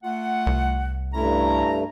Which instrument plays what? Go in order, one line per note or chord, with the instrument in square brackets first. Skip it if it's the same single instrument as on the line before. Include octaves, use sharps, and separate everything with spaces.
[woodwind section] A3 F4 F#5
[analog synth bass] C2
[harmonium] G2 A3 [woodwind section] C#4 E4 A#5